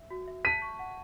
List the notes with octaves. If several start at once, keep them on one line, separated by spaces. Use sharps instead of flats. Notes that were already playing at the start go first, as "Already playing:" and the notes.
Already playing: E5
F#4
E5
A5 B6 D#7
C#6
F#5